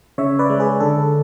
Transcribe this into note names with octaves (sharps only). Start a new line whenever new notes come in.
C#3 C#5 E5
B4 D5
G#3
G#4 B4
D3 A4